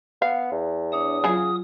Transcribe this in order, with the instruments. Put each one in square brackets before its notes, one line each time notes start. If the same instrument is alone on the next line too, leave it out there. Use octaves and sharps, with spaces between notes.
[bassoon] B3 [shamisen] F5
[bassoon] E2
[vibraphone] D4 C#5 E5 [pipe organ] D#6
[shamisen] C#3 G#4 [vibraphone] F#3 F4